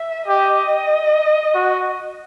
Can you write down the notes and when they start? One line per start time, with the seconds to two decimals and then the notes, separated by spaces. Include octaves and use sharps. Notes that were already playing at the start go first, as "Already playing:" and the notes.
Already playing: E5
0.28 G4 D#5
1.54 F#4